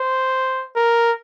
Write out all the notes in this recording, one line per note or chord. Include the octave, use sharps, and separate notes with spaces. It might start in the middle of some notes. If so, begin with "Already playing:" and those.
Already playing: C5
A#4